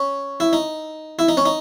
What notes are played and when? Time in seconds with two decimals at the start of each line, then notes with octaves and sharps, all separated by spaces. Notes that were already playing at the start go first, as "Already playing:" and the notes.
Already playing: C#4
0.40 E4
0.53 D#4
1.19 E4
1.29 D#4
1.37 C#4
1.46 D#4